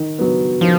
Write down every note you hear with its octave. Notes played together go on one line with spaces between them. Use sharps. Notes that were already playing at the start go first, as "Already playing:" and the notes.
Already playing: D#3
F#3 B3
D#3 F3